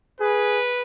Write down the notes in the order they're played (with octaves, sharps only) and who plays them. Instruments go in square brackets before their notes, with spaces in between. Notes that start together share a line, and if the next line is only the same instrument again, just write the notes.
[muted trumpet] G#4 [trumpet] B4